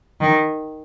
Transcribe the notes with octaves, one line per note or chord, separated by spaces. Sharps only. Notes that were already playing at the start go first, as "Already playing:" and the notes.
D#3